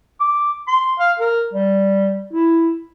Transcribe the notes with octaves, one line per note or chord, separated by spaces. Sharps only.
D6
C6
F5
A#4
G3
E4